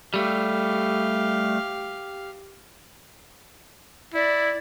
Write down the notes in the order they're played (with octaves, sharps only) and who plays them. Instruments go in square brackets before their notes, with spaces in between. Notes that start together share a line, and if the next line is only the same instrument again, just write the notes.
[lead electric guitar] G3 A3 [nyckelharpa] G4 F5
[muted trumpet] E4 [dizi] D5